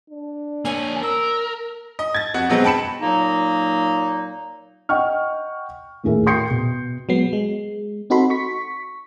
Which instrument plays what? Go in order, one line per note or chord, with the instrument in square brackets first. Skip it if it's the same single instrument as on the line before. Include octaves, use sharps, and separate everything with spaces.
[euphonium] D4
[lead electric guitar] A#3 C#5 [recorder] G#5
[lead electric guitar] A#4 [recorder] E6
[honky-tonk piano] D#5
G#6 A6
F2 F#4
B2 F#3 G#3 B3 C4
G5 A5 B5 C#7 E7
[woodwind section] A#2 F#3 A#3 D#4
[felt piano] D#5 F#5 G5 C#6 F6
D#2 A2 G#4 A#4 E5
G5 C6 D#6 G6 C7 C#7
B2
[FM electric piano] F#3 G#3 B3 C7
G#3
C4 D#4 F#4 A4 B5 C6
C#6 B6